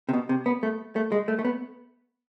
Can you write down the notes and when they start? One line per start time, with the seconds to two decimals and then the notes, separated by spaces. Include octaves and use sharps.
0.09 C3
0.13 B2
0.29 C3
0.46 B3
0.63 A3
0.96 A3
1.12 G#3
1.28 A3
1.39 A3
1.45 B3